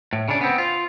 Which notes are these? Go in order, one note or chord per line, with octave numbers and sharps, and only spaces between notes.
A2
C#3 D4
B3 C4
F4